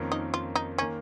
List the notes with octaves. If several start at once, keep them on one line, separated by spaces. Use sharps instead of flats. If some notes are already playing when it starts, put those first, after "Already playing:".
Already playing: F2 D#3 A#3 C#4
D#4
F4
D#4
D#3 A#3 C#4